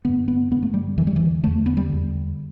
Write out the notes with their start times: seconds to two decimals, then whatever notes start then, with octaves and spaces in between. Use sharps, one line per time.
0.05 G2 D3 B3
0.28 B3
0.51 G2 D3 B3
0.63 A3
0.74 G3
0.97 E2 D3 E3
1.07 G3
1.16 E3
1.43 E2 D3 A3
1.66 B3
1.77 G3
1.89 E2 D3